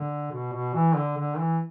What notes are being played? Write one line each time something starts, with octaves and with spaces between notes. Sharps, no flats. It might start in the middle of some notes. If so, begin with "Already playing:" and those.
Already playing: D3
B2
B2
E3
D3
D3
E3